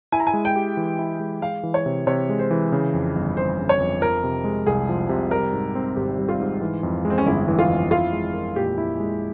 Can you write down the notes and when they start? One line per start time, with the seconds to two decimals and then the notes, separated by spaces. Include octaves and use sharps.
0.12 E4 G#5
0.20 A#5
0.27 G#5
0.34 G#3
0.45 G5
0.56 G4
0.77 E3
0.99 E4
1.20 G#3
1.42 G#3 F5
1.63 E3
1.74 C#5
1.86 C3
2.07 C3 C#5
2.29 G#3
2.39 C5
2.51 E3
2.72 C#3
2.94 F2
3.16 G1
3.37 G1 C5
3.59 C#3
3.69 C#5
3.80 F2
4.01 F3 A#4
4.24 C3
4.44 G#3
4.66 C2 G#4
4.89 F3
5.09 C3
5.31 G3 A#4
5.53 G#2
5.75 C4
5.96 G#1 G4
6.18 G3
6.29 F4
6.40 G#2
6.61 E3
6.83 F2
7.05 G#3
7.10 C4
7.18 C#4
7.26 G1 E4
7.48 E3
7.59 F4
7.70 F2
7.90 E4 F4
8.12 G#3
8.34 A#4
8.56 A#2 G4
8.78 E4
9.00 G#3